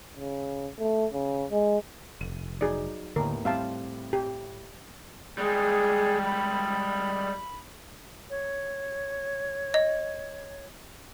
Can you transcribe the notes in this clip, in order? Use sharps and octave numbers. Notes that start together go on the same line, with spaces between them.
C#3
A3
C#3
G#3
F1 D#7
F#3 D#4 G#4 D5
D#2 A2 D3 B3 A#4
A2 G3 C4 E5 F5 A5
G4
G3 G#3 G#4
B5
C#5
D#5